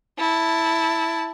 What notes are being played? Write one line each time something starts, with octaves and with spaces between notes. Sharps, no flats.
E4 A5